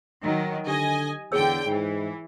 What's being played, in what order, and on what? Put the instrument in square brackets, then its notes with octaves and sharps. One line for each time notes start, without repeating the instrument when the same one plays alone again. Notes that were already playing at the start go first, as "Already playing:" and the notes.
[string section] D#3 F#3
[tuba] D3 [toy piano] G4 [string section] D#5 G#5
[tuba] E2 [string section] D3 G5 [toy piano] G#4 C#5 E6
[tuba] G#2 [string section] E3